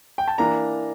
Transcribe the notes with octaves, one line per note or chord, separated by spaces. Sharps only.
G5
A5
E3 A#3 D4 A#5